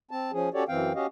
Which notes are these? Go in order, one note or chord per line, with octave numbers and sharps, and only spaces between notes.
C4 A5
F3 C#4 G#4
C#4 F#4 G4 A4 C#5 D5
F#2 E3 C4 F5 G5
C#4 F#4 G4 D#5 F5